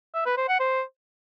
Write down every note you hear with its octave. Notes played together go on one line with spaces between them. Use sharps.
E5
B4
C5
F#5
C5